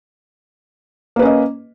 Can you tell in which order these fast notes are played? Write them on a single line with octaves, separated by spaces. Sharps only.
A#3 B4 C#4 D#5